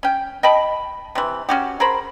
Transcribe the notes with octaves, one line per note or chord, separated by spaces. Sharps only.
C#4 G5
D#5 G5 A5 B5
C3 E3
C#4 F#4 G4
G#4 A#4 C5 B5